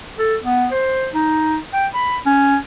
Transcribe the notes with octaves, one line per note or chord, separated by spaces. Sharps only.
A4
B3
C5
D#4
G5
B5
C#4